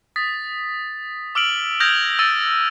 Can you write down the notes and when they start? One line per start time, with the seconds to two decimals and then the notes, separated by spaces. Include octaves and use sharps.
0.16 D#6 A6 B6
1.35 D6 E6 F6 D7 F#7
1.80 D#6 F6 G6 G#6 A#6 F7
2.19 E6 G6 A6 D#7